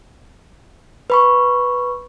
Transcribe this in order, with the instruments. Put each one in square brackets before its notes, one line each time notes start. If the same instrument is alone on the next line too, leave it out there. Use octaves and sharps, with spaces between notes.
[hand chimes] B4 B5 C#6